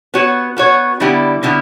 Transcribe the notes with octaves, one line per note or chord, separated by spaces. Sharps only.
B3 F#4 C#5
B3 F#4 C#5
D3 G3 B3 E4 G4
D3 G3 B3 E4 G4